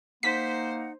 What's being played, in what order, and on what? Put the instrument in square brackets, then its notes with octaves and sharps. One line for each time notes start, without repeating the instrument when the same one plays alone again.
[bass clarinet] A#3 [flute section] D#4 F#5 [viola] C5 [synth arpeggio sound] B6